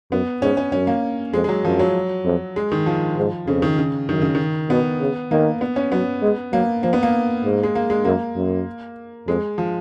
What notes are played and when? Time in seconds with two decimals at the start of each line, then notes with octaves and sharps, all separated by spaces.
0.11 F#2 B3
0.42 G#2 C#4
0.57 C#4
0.72 F#2 C#4
0.87 A#3
1.33 F2 G#3
1.44 G#3
1.49 F#3
1.64 F#2 F3
1.79 F#3
2.25 F2
2.56 G#3
2.72 D#3
2.86 F3
3.17 G#2
3.47 F2 C#3
3.62 D#3
3.78 C#3
4.09 F#2 D#3
4.22 C#3
4.35 D#3
4.69 B2 B3
5.00 C#3
5.31 D#3 A#3
5.61 B3
5.76 C#4
5.92 F#3 B3
6.22 G#3
6.53 F#3 A#3
6.83 F3 A#3
6.93 B3
7.03 A#3
7.44 G#2
7.63 G#3
7.75 A#3
7.90 G#3
8.05 F#2 A#3
8.36 F#2
9.27 F2 G#3
9.58 F3